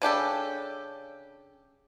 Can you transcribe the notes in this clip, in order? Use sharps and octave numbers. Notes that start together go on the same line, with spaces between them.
C#3 D4 G4 A4